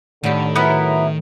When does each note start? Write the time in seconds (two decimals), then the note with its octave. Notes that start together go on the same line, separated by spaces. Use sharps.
0.24 A2 D3 D#3 G4
0.56 F#3 B3 E4 A#4 B4